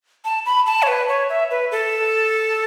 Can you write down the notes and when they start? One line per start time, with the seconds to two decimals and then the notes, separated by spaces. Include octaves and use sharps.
0.25 A5
0.46 B5
0.66 A5
0.82 C#5
0.88 B4
1.08 C#5
1.29 E5
1.51 B4
1.71 A4